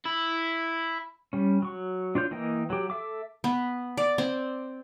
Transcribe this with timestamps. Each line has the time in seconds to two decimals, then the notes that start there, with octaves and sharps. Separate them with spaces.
0.06 E4
1.33 G3 C#4
1.62 F#3 C#6
2.15 D4 F4 C#5 G6
2.31 E3 A#3 D#5 G5
2.70 F#3 G4
2.90 A4 E5 D6
3.44 B3
3.97 D5
4.18 C4